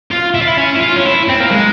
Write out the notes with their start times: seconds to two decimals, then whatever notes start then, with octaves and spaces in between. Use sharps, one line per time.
0.11 F4
0.35 E4
0.42 F4
0.48 E4
0.58 C#4
0.75 E4
0.80 F4
0.96 C#4
1.05 E4
1.28 C4
1.40 A#3
1.51 G#3